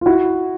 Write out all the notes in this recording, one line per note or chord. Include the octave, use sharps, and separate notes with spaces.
F4
E4 F#4